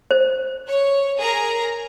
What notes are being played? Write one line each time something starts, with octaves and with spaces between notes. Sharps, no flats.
C5
C#5
G#4 A#4 A#5